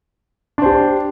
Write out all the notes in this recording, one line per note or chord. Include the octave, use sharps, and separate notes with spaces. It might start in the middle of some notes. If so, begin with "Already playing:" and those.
D4 G4 C5